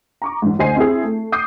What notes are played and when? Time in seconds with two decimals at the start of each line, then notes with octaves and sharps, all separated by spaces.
0.22 A#5 C#6 D6
0.42 A1 G#2
0.59 D2 C5 D#5 G#5 C7
0.76 C4 E4 G#4
1.04 A3
1.32 D6 D#6 G6 C7